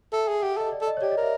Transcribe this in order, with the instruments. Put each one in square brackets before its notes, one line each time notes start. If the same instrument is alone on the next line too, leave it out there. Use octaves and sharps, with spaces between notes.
[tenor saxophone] A4 [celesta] E5
[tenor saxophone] G#4
[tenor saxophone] G4 [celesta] F#5
[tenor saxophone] A4 [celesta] D#5
[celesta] D5
[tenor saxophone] A4
[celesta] D#5
C#5
[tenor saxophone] G4 [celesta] D5
[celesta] D#5
[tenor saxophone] A#4 [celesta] E5